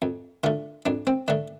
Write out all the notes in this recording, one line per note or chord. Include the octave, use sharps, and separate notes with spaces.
F2
D3 A3 F4
F2 D4
C4
D3 A3 D4